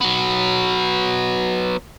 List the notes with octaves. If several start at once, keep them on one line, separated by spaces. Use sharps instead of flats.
F#3 B3